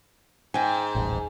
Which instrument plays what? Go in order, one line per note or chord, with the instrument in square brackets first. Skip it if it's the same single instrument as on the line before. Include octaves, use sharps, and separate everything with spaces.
[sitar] G#2 [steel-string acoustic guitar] G5 G#5
[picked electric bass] D#1 A1